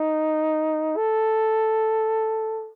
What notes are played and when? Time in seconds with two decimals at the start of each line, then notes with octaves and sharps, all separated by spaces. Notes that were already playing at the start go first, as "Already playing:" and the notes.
Already playing: D#4
0.97 A4